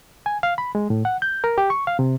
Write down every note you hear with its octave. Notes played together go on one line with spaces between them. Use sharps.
G#5
F5
B5
G#3
A2
F#5
G6
A#4
G4
C#6
F5
C3